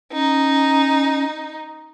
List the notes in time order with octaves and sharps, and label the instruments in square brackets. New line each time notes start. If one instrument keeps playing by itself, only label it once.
[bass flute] C#4 [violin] D#4